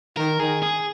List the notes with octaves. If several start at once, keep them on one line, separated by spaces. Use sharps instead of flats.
D#3 A#4
D#3 G#4
G#4